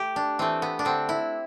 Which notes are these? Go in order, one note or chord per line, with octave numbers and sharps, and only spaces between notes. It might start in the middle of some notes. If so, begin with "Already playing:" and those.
Already playing: A3 G4
D4
E3 A3 C4
B3
D4
D3 C4
E4